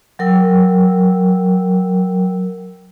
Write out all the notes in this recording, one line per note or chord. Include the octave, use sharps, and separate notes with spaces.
F#3 A#4 G5 E6